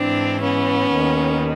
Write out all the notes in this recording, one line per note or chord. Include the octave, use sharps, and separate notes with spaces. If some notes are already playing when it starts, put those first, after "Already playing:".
Already playing: G#2 E3 C4 D4
B3 C#4
D#2 D#3